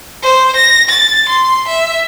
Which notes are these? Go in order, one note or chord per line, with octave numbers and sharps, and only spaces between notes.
C5
A#6
A6
C6
E5